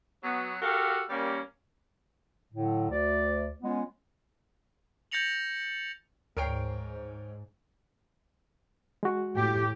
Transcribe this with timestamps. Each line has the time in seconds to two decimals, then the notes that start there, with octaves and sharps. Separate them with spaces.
0.23 F#3 B3
0.62 F#4 G4 A4 A#4 F5
1.10 G3 A#3 C#4
2.53 A2 D3 F#3
2.90 D2 D5
3.62 G#3 B3 C#4 F4
5.12 G6 A6 A#6 C#7 F7 F#7
6.37 D2 G#2 A#4 C#5 G5 C7 D7
9.03 G#3 F#4
9.35 A2 G4